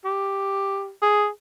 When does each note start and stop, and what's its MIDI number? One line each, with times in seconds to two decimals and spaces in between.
0.05 0.91 67
1.02 1.28 68